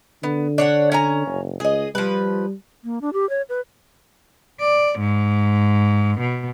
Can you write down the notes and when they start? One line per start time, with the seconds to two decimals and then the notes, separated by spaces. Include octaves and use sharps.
0.23 D3 B3
0.58 D4 C#5 F#5
0.92 C#4 G#5 A#5
1.27 F#1
1.60 C#2 G#4 D#5
1.95 F3 G3 B4
2.84 A#3
3.01 D4
3.13 G4
3.30 C#5
3.49 B4
4.60 D5
5.00 G#2
6.21 B2